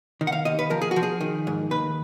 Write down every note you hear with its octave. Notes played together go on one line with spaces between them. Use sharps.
D#3
F#5
F5
D#2 D#5
B4
F3 A#4
G#4
F#4
F3
G#4
D#3
G#2
D#2 B4